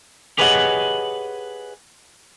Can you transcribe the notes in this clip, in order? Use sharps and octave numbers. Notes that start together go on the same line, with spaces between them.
G4 G#4 B4 C#5 D#5 F#5